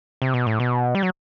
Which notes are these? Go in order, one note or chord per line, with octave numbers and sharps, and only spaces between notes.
C3
B2
A2
B2
G3
F#3